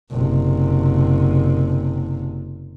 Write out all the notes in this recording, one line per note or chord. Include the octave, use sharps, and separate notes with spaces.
F#1 C3